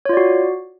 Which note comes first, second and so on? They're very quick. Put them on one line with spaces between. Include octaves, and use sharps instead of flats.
C#5 F4 D5 F#4